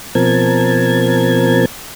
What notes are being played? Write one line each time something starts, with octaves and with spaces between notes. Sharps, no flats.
B2 F3 C4 A#4 A5 G#6